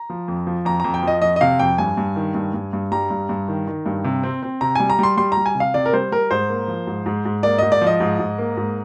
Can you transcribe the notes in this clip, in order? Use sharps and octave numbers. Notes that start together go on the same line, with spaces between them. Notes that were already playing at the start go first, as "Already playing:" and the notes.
Already playing: A#5
F3
F2
F3
F2 A#5
F2 A#5
G5
F3 D#5
F2 D#5
D#5
C3 F5
F2 G5
G2 G#5
G2
D#3
G2
G2
G2
G3 A#5
G2
G2
D#3
D#3
G2
C3
C4
C4
C3 A#5
G3 G#5
A#5
G3 C6
G3 C6
A#5
G3
G#5
C3
F5
C3 D5
A#4
G3 C5
G3 A#4
G#2 C5
A#3
F3
G#2
G#2
G#2
A#3 D5
G#2 D#5
D5
F3
D#5
G#2
G#2
A#3
G#2